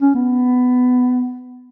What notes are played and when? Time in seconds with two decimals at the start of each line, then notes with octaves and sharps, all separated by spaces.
0.02 C#4
0.15 B3